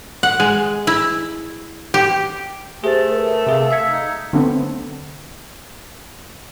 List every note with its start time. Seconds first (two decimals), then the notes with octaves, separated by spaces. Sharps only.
0.23 F#5
0.40 G#3
0.87 E4
1.94 G4
2.84 A3 G4 G#4 C5 A6
3.11 A#4 B4
3.46 C3 G#4 F5
3.71 F5 E6 G#6 B6 C#7
3.89 D#4
4.33 D3 F#3 A3 B3 C4